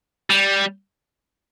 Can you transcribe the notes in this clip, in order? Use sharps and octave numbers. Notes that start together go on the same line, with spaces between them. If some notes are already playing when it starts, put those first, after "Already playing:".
G3